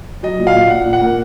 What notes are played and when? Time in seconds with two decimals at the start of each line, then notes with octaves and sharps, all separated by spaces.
0.23 F#3 D#5
0.39 A#2
0.47 F5
0.55 A#2
0.70 A#2 F#5
0.86 A#2
0.93 F#5
1.01 A#3